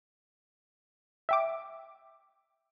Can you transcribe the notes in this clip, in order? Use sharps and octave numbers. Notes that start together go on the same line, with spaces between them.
E5 G5 D6